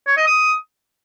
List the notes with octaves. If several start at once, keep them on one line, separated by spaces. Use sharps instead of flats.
C#5
D#5
D#6